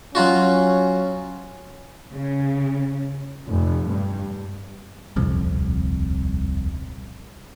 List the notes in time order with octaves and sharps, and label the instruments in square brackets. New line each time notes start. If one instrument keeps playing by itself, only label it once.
[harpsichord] F#3 F4 F#4 [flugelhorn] C#4
[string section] C#3
[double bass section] F1
G2
[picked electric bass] D#1 C2 F2